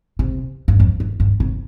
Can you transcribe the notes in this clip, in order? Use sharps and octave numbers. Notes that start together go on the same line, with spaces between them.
C3
G2
F2
G2
G2
C3